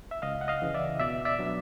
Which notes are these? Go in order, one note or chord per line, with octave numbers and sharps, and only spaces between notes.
E5
C#2 D#5 F5
F#5
D#5 F5
C#3 E3
D5 E5
B2 D5 E5
D5 E5
F#3 B3 D4